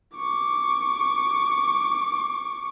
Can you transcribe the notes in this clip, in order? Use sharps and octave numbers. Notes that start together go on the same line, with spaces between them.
C#6 D6